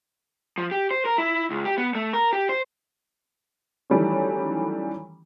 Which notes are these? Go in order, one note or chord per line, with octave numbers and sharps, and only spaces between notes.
F3
G4
C5
A#4
E4
C#2
G4
B3
A3
A#4
G4
C5
D#3 E3 F#3 G3 A3 C#4